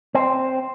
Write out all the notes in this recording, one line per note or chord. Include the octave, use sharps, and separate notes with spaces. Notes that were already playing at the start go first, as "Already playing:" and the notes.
C4